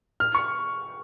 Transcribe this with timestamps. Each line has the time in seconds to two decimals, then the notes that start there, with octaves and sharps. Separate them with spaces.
0.20 F6
0.35 C#6